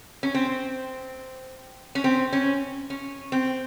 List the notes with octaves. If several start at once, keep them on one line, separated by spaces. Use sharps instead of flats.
C#4
C4
C#4
C4
C#4
C#4
C4